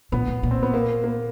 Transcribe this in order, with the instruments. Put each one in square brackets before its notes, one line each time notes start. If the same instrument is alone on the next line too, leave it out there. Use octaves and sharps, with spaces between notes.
[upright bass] A#2 [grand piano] B3
[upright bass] A#2
A#2
[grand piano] C4
B3
A#3
A#3